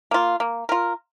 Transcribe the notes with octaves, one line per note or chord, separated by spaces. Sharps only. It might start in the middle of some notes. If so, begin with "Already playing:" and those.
A#3 F4
A#3
F4 A#4